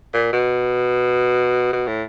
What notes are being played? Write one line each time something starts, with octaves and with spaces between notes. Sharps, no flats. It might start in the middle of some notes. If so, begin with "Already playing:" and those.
A#2
B2
B2
A2